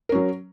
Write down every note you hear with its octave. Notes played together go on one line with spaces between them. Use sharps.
F#3 C#4 A#4